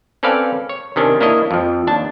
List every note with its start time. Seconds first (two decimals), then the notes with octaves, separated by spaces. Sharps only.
0.23 C4 C#4 A4 B4 D5 F5
0.69 C#5
0.96 C3 D#3 C#4 D4
1.20 A#3 D4 E4 C#5 D#5
1.51 F2 F3
1.87 D#2 D4 A5